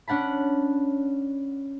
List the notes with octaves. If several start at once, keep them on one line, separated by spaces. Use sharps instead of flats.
C#4 D4 F#5 A5 B5